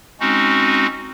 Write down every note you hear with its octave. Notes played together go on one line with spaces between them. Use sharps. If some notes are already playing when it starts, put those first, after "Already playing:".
G#3 C4 C#4 D#4 F#4